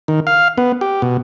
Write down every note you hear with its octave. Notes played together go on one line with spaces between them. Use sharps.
D#3
F5
B3
G4
B2